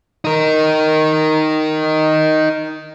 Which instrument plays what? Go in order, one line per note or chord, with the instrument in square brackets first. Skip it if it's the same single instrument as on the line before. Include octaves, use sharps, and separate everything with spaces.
[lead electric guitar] D#4 A#4